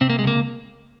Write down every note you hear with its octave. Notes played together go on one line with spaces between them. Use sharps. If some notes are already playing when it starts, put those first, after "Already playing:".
C3 C4
A#3
G#3
C#2 A#3